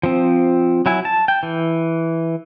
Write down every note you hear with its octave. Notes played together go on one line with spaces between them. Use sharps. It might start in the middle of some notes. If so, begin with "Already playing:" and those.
F3 C4
F#3 E4 G#5
A5
G5
E3